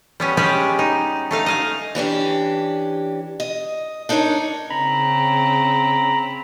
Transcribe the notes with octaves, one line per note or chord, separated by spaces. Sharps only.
G3 B3 C#4
G3 G#3 C#4 G4 D5
D#4
A3 D#4 F5
D#5 F5 G#5
E3 C#4 D4 G4
D#5
D4 D#4 A#4 B4 C#5
C#3 C4 A#5 B5